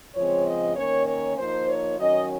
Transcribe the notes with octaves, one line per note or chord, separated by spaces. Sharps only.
C#3 F3 G#3 C4 C#5
D#5
D#3 A#3 C#4 C#5
C#5
F3 A#3 D#4 C5
C#5
D#3 F#3 C#4 D#5